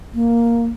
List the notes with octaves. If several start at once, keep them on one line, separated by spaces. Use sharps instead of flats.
A#3